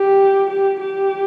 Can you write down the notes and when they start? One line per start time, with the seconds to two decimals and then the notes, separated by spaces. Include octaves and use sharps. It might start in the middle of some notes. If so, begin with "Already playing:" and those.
Already playing: G4
0.51 G4
0.80 G4